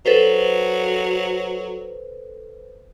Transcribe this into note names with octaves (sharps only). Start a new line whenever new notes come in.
F#3 A4 B4 C5